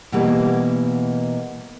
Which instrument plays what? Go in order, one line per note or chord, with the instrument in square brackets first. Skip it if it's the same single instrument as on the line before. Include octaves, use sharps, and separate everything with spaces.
[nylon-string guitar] B2 E3 G3 A#3